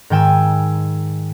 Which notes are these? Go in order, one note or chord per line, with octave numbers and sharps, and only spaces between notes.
G#2 D#3 G5 G#5 E6